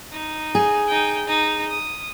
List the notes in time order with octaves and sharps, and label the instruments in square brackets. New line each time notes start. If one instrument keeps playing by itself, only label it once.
[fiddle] D#4
[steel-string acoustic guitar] G#4
[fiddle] D#4 G5
D#4
D#6